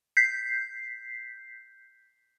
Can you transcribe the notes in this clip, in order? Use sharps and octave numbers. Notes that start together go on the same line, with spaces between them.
G6 B6 C7